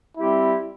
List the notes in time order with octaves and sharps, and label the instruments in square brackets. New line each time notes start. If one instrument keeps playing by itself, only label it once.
[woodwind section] G3 C4 G4 [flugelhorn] E4